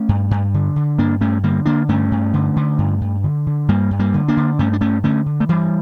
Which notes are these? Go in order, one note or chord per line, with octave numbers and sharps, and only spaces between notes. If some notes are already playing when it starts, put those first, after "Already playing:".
Already playing: A3 C#4
G2
G2
D3
D3
G2 A#3 D4
G2 A3 C#4
D3 G3 A#3
D3 A#3 D4
G2 A3 C#4
G2
D3
D3
G2
G2
D3
D3
G2 G3 A#3
G2
G3 A#3
D3
A#3 D4
D3
G2 A3 C#4
D4
G2 A3 C#4
D3 A3 C#4
D3
A3
G2 E3 G3